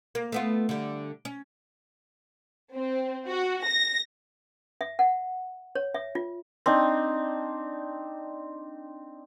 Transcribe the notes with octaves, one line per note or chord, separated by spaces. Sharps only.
A#3
A3 B3 F4
D3 G3
C#4
C4
F#4
A#6
E5
F#5
C#5
E5
F4
C4 D4 D#4